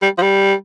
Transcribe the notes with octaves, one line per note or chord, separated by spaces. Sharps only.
G3
F3
G3